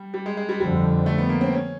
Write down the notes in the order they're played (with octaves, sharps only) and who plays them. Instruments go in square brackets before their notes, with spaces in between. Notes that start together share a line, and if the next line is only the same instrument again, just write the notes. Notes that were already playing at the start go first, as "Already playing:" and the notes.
Already playing: [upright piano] G3
G3
G#3
G#3
G3
[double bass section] F2 D3 F3 [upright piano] G3
[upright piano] A3
B3
A#3
C4
C#4